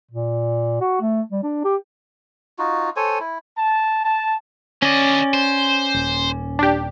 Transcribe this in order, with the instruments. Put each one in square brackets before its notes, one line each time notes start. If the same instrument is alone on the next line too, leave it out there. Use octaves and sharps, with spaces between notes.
[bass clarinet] A#2
F#4
A3
G3
D4
G4
[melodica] D#4 F4 F#4
A4 C5 C#5 G#5
E4
[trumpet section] A5
A5
[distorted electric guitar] D3 D#5 [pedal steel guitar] C#4 D5
[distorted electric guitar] C5
[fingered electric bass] D#1
[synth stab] D4 G4